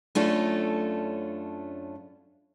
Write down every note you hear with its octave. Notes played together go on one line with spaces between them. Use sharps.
F#2 A3 C#4 D4 F4 A4